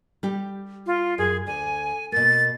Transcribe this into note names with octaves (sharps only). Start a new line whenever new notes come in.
G3 G4
F4
F#2 G#4
D2 G#5
B2 A#3 A6